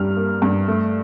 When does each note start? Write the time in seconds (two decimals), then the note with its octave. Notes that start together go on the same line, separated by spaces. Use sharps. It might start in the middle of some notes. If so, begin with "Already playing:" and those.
Already playing: G2 G3 F6
0.16 A#3
0.42 G2
0.68 A3